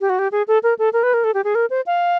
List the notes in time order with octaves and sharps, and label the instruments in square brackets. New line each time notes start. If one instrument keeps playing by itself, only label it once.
[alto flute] G4
F#4
G4
G#4
A4
A#4
A4
A#4
B4
A#4
A4
G4
G#4
A#4
C5
F5